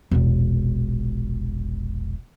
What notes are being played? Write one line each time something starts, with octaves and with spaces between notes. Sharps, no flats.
E1 A#1